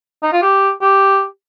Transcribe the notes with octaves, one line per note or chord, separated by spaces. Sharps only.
D#4
F4
G4
G4